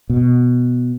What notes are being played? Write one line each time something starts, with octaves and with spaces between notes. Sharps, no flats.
B2